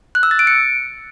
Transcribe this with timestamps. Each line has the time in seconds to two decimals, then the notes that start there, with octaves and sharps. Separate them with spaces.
0.15 F#6
0.23 E6
0.31 A6
0.39 D7
0.47 C#7